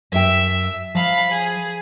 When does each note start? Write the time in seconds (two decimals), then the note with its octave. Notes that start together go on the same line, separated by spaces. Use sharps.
0.12 F#2 E5 G5 E6
0.95 F3 F5 B5
1.31 G#4